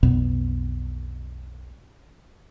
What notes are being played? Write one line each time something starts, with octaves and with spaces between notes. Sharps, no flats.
B1 F2 B2 B3